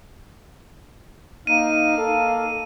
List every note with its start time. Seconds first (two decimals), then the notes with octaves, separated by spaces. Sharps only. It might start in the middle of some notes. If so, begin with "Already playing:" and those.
1.47 A#3 D#4 F5 D#7
1.97 A4